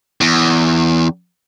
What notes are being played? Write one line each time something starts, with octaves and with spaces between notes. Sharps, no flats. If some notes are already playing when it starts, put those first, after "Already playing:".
E2